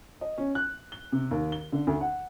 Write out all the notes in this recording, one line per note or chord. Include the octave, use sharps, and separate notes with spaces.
D#5
C#4
F#6
G7
C3
D#2
G7
D3
D2
F#5